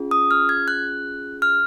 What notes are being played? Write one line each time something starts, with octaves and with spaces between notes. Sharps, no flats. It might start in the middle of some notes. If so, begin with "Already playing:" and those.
Already playing: C#4 F4 G#4
D#6
F6
G#6
F#6
F6